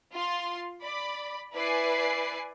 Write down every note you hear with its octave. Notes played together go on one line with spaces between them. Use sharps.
F4 F5 C6
D5 B5
E4 B4 D5 G#5 C7